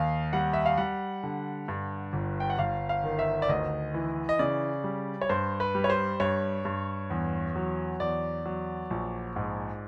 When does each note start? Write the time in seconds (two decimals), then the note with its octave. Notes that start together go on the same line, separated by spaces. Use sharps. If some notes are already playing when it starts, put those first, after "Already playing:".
Already playing: D#2 F5
0.33 G3 F#5
0.53 E5
0.66 F5
0.78 G3 F#5
1.23 D3
1.68 G2
2.13 G1
2.40 G5
2.50 F#5
2.58 G1 F5
2.89 F5
3.04 D#3
3.19 E5
3.42 D5
3.49 D2 D#5
3.94 E3
4.29 D#5
4.39 C#3 D5
4.84 G3
5.21 C#5
5.29 G2 C5
5.60 B4
5.75 G3
5.84 C#5
5.90 C5
6.20 G2 C#5
6.65 G2
7.10 E2
7.56 F#3
8.00 E2 D5
8.45 F#3
8.90 A#1
9.36 G#2